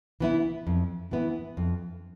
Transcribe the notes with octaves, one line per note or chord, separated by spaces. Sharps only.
E3 B3 E4
F2
E3 B3 E4
F2